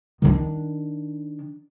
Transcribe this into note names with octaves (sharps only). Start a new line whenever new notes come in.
D#3 D4